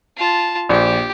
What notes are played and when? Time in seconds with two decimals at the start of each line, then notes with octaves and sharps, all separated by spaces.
0.17 F4 A5
0.69 A#1 G4